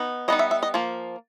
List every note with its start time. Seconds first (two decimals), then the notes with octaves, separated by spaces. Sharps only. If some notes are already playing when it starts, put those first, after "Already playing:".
Already playing: B3 D#4
0.28 G3 B3 D#4 D#5
0.39 E5
0.51 E5
0.63 D#5
0.74 F3 A#3